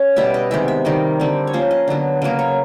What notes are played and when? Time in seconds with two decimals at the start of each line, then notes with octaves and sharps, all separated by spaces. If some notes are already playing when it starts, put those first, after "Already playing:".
Already playing: C#4
0.16 B2 G3 B3 E5
0.34 D#5
0.51 C3 D#3 G#3 B3 E5
0.68 E5
0.85 C3 D#3 G3 D#5
1.20 D3 G3 C4
1.47 C#5
1.53 F3 A#3 C#4 C5
1.71 D#5
1.88 D3 F#3 B3
2.22 C#3 F#3 A#3 D#5
2.39 C#5